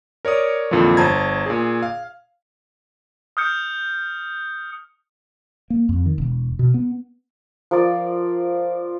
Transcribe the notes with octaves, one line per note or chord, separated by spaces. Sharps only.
A#4 C#5 D5 D#6
F2 A#2 D3 E3 F3
G1 C5 A5 A#5 G#6
A#2 G#4
F5
D#6 F6 G6 C#7
A#3
F2
D#3
E1
B2
B3
F3 A#4 D5